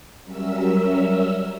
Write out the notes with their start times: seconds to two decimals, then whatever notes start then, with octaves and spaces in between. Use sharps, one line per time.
0.24 F#3 G3 C#4 A#4 E5 E6